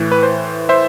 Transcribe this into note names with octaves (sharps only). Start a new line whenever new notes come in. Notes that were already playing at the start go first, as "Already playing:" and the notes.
Already playing: A2 E3
B4
C5
C5 E5